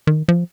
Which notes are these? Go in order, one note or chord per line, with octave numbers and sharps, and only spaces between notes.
D#3
F3